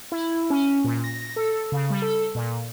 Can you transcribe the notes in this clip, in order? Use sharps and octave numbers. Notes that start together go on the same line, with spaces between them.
E4
C#4
A#2
A#6
A4
C#3
G3
A4
A#2